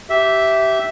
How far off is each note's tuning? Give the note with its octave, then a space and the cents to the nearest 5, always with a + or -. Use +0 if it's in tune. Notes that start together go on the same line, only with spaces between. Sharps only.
G4 -20 E5 -5